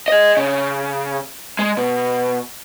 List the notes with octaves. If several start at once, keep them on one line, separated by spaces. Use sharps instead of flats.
G#4 D#5
C#3
G#3
B2